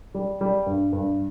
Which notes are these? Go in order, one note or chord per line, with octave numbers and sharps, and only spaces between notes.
G3
G3
G2
G2